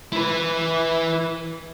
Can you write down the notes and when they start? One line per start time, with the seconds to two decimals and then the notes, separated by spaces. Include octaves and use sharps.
0.13 E4 B4